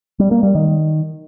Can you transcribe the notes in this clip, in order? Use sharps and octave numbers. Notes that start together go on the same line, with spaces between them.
G3
A#3
G3
D#3